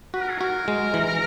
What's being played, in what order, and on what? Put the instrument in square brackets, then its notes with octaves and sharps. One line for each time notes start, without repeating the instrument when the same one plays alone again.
[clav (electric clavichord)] F#4 [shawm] B4
[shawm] A#4
G#4
[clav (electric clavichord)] F#4 [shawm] A#4
[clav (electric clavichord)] G#3
E3